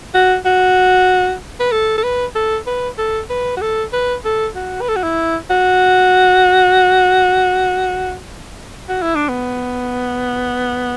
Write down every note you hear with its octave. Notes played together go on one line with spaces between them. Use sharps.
F#4
F#4
B4
A4
A4
B4
A4
B4
A4
B4
F#4
A4
B4
A4
F#4
B4
A4
F#4
E4
F#4
F#4
E4
D4
B3